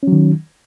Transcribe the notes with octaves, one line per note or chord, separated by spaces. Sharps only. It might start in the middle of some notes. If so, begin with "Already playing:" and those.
D#3 F#3 C#4